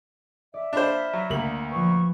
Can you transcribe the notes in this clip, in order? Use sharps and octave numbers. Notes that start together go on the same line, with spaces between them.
D5 E5
D4 C5 F5 B5
F#3
D2 A#3 F#7
F3 B4 C#6